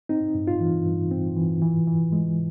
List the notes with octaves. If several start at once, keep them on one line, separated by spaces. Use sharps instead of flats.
C4 D#4
G2
F4
E3
G2
C4
E3
E3
E3
G#3